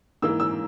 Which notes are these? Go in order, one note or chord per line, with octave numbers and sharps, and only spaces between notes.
G#2 E3 A#3 E6
E6